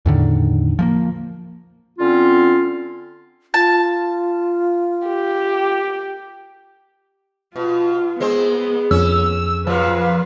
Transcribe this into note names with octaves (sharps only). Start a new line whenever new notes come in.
E2 A2 D3 D#3
F3 G#3 A#3
D3 C4 C#4 F4
F4 A5
G4
B2 F4
G#3 B3 C4 C5
F2 C#4 E6
A#2 F3 F#3 B4 F5